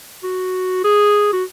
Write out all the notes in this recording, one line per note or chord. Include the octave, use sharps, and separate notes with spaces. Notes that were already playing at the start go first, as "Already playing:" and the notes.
F#4
G#4
F#4